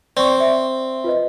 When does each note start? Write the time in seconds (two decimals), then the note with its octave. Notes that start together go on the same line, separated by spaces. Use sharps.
0.17 C4 D5 C#6
0.40 E5
1.04 F4 B4 D#5